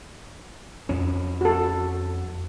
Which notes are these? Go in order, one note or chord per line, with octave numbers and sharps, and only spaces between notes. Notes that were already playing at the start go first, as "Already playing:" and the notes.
F2 C#4
F#4 A4